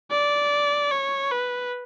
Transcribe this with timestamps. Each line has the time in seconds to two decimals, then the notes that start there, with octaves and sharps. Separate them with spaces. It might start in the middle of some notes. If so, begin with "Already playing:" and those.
0.12 D5
0.91 C#5
1.32 B4